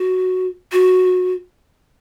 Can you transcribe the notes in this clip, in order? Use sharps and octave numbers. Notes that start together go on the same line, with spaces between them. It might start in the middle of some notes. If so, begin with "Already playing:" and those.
Already playing: F#4
F#4